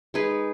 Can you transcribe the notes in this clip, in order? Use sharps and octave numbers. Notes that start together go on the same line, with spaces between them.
G#3 D#4 G#4 B4